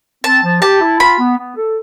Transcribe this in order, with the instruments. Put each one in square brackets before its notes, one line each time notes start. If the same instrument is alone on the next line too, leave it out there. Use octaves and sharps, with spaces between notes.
[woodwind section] C4 [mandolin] A5
[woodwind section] F3
[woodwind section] G4 [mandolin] A5
[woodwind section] E4
[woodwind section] F4 [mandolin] B5
[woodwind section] B3
B3
A4